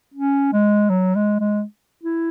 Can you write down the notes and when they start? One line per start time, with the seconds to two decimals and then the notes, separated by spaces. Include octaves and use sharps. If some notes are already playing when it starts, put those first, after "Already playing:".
0.14 C#4
0.53 G#3
0.90 F#3
1.15 G#3
1.40 G#3
2.04 E4